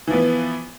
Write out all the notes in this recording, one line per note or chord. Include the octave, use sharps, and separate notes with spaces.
E3 F3 B3